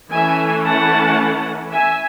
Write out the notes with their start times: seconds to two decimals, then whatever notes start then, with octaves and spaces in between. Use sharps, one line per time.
0.12 E3 A3 C#4 E5 G#5
0.65 F#5 A5
1.71 E5 G#5